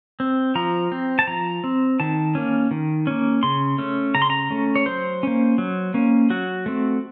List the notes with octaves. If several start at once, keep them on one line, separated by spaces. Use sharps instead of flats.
C4
F3 A#5
C4
A5
F3 A#5
C4
D#3 A5
A#3 C#4
D#3
A#3 C#4
C#3 C6
A3 C#4
C#3 A#5
C6
A#5
A3 C#4
C#5
F#3 C5
A#3 C#4
F#3
A#3 C#4
F#3 F#4
A3 C4